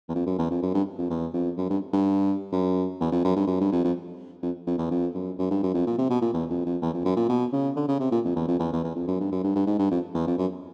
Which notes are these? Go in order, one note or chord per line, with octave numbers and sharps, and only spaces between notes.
E2
F2
F#2
E2
F2
F#2
G2
F2
E2
F2
F#2
G2
G2
F#2
E2
F2
F#2
G2
F#2
G2
F2
F2
F2
F2
E2
F2
F#2
F#2
G2
F#2
F2
A#2
C3
B2
A#2
E2
F2
F2
E2
F2
F#2
A#2
B2
C#3
D3
C#3
C3
A#2
F2
E2
F2
E2
E2
E2
F2
F#2
G2
F#2
G2
G2
G#2
G2
F2
E2
F2
F#2